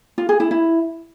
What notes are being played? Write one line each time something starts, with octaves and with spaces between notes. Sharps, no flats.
F4
G#4
E4
E4